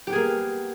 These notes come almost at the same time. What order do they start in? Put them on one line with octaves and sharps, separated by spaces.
G4 B3 G#4 A#3